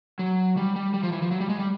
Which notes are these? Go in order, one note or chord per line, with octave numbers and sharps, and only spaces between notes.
F#3
G3
G3
G3
F3
E3
F3
F#3
G3
G#3
G3